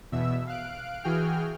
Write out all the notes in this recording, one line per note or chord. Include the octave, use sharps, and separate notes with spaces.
E2 B2 E5 E6
F5 F#6 D7
E3 F#4 G#4 G5 F6